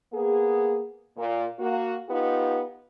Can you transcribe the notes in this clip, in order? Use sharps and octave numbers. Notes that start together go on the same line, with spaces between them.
A#3 B3 G#4
A#2
A#3 F#4
B3 D#4 F4 G4